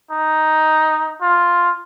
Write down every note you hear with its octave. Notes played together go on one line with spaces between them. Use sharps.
D#4
F4